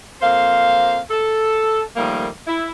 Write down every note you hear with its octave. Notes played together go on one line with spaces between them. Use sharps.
F2 A#3 C5 F5
A4
D#3 F3 G3 A3 A#3
E4